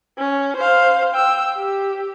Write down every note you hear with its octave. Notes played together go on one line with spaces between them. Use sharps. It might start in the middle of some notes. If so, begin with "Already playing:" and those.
C#4
C5 F5
G5 E6
G4